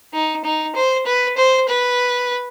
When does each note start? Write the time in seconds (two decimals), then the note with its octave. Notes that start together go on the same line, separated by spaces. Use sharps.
0.13 D#4
0.44 D#4
0.75 C5
1.06 B4
1.37 C5
1.68 B4